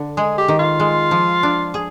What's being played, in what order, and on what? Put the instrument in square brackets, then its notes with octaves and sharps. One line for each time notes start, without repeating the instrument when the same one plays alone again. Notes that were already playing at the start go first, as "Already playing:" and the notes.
Already playing: [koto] D3
[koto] G#3 [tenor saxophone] G#4
[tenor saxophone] G4
[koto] D#3
[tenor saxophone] F4
[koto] G#3
F3
D4
G#4